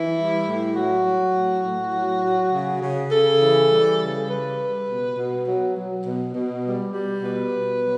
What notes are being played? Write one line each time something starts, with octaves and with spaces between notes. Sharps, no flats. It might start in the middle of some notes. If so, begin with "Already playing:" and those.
Already playing: E3 E4
G3
A2
F#3 F#4
F#3
A2
A2
F#3
F#3
C#3
C#3
C#3 A4
E3
G3
C#3
G3 B4
G3
B2
B2
F#3
F#3
B2
B2
G3
G3
B2 B4
B2
F#3